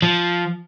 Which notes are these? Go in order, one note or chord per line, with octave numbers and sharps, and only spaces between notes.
F3